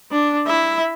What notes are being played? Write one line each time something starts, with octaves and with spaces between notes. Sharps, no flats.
D4
E4 E5